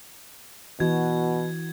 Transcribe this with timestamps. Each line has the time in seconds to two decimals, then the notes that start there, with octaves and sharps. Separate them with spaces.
0.80 B2 E3 F#4 G#6